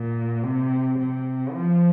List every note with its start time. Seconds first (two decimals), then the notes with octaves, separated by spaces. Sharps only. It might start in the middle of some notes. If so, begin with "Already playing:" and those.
Already playing: A#2
0.43 C3
0.99 C3
1.54 F3